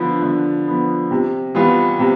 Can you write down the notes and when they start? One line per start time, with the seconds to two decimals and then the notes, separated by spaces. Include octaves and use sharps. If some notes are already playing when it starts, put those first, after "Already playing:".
Already playing: D3 F3 B3
0.22 D3
0.67 F3 B3
1.11 C3
1.55 E3 G3 B3 F4
1.99 C3